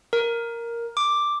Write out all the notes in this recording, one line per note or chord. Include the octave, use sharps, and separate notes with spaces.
A#4
D6